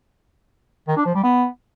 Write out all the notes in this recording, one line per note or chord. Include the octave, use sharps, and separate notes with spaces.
D#3
D4
F3
G3
B3